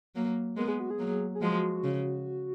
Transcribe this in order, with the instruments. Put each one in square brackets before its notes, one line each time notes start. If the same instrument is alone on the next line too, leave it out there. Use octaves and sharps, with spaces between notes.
[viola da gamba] F#3 A#3
[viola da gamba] G#3 B3 [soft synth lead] A#4
[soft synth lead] G#4
F#4
G#4
[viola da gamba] F#3 A#3
[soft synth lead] G#4
[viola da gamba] F3 G#3 [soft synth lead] F#4
[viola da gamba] C#3